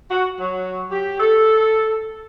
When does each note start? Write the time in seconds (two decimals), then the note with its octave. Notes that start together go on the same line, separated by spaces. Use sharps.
0.11 F#4
0.40 F#3
0.92 G4
1.20 A4